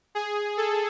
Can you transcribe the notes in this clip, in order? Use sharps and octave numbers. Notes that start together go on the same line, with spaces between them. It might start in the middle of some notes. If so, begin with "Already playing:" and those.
G#4
A4